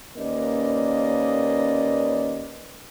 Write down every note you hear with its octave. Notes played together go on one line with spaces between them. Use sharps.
D#2 A#3 C#4 B4 D5 D#5